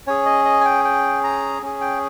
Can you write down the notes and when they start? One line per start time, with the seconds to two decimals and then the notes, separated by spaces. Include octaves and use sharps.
0.07 C#4 G#4 C#5
0.26 D#5
0.45 D#5
0.61 G#5
0.65 G5
0.85 G5
1.24 A#5
1.62 C#4 G#4
1.81 G5